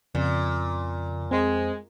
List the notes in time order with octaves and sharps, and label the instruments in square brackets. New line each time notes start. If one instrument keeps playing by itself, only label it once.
[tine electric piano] F2 [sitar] A#2 [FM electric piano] C#3
[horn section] G#3 [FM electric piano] C4